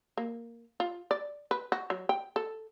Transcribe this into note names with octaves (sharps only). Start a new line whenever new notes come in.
A#3
F4
D5
B4
F#4
F#3
G5
A4